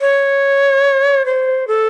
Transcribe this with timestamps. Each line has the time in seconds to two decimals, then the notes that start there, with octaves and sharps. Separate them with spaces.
0.01 C#5
1.26 C5
1.68 A4